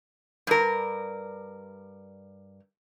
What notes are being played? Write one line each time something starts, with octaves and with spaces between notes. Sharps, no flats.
G2 A#4